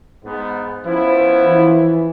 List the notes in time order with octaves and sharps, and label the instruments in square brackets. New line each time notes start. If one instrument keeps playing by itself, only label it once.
[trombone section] G#2 B3
[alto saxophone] F3 [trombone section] B3 C#4 E4
[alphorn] E3